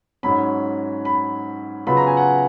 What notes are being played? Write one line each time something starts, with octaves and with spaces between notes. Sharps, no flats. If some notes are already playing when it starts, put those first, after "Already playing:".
G#2 F#3 C#4 B5
B5
C#3 F#3 B3 F4 B5
A#5
G#5
F#5